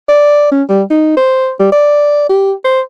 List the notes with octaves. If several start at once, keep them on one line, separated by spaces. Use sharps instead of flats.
D5
C#4
G3
D#4
C5
G3
D5
G4
C5